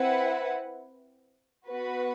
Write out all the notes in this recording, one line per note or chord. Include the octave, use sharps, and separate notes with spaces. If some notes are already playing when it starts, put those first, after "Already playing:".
Already playing: C4 E4 B4 F#5
B3 F#4 B4